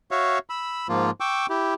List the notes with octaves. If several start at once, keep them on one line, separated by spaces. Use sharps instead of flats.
F#4 C#5 E5 F5
B5 E6
G#2 F3 A#3 F4
G5 C#6 D6 E6
E4 G4